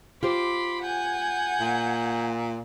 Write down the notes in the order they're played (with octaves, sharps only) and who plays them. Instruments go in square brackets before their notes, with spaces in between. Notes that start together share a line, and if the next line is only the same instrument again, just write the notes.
[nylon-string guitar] F4 G4 C5 [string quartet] B5 C6 D6
[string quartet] F#5 G#5 G6
[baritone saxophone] A#2